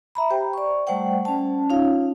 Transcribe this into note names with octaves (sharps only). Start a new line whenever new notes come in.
E5 A#5 B5
G4 C5 G5
D5 C#6
G3 A3 C5 D5 F#5 G5
C#4 A5
C#4 D#4 F4 C#5 F5